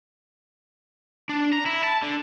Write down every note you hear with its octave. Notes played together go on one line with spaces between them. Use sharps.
D4
A#5
E4
A5
D3